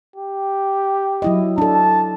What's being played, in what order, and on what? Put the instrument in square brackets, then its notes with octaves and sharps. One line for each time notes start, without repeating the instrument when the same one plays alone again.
[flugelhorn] G4
[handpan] F#3 E4 D#5
[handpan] D4 A4 [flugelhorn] A5